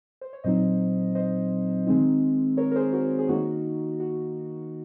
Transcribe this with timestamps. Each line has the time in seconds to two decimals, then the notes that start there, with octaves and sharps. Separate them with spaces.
0.21 C5
0.33 C#5
0.44 A#2 F#3 C4 D#4 C5 D#5
1.15 C5 D#5
1.87 D#3 G#3 C4 D#4
2.57 A#4 C#5
2.72 A#4
2.76 G#4 C5
2.93 F#4 A#4
3.19 G#4
3.29 D#3 A#3 D#4 F#4
4.00 F#4